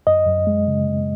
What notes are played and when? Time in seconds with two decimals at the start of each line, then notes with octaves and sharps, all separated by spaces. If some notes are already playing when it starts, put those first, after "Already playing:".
0.07 F#2 D#5
0.27 F#2
0.47 G#3
0.67 C#3